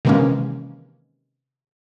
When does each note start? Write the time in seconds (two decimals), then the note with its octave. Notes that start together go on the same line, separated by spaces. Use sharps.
0.05 C3 D#3 E3 G#3 A#3 C#4